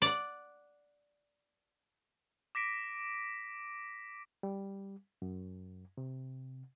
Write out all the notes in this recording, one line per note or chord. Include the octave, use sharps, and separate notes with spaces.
D5 F#5
D6 A#6 B6 D7
G3
F#2
C3